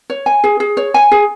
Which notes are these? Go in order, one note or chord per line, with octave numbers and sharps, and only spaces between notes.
C#5
G#5
G#4
G#4
C#5
G#5
G#4